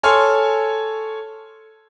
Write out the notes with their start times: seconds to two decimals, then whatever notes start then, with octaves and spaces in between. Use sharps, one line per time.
0.03 A4 C#5 G#5 C6 F6